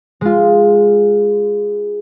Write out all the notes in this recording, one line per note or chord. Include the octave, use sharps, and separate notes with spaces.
G#3 F4